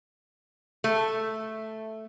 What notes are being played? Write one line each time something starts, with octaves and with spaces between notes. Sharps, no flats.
A3